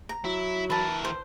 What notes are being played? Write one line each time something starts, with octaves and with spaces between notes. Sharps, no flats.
A#5
F#3 E4
E3 A#4 A5 B5
C5